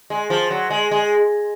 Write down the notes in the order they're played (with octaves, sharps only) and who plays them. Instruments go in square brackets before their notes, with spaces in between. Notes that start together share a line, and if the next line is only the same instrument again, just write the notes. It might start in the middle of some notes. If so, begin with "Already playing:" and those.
[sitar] G#3
F3
F#3
G#3
G#3